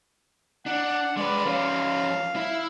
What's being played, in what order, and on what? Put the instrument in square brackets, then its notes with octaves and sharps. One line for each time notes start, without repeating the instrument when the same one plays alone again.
[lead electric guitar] D4 [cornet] F#5
[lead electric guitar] G#3 B4 [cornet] D5
[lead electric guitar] F3 C#4 [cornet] F5
[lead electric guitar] E4